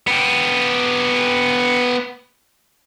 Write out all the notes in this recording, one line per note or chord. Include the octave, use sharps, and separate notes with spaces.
B3 G4